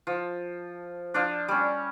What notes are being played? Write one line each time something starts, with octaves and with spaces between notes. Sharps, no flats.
F3
F3 D4
G3 C#4